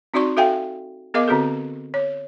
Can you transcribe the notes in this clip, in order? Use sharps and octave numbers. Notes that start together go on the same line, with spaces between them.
C4 D#4 F#4 D5 C6 C#6
F#4 A4 E5 F5 G5 G#5
B3 G#4 A#4 D#5 F5 D6
D3 C4 F#4 G#4 A4
C#5